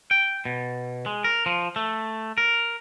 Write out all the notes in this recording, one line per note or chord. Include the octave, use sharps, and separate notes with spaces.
G5
B2
G#3
A#4
F3
A3
A#4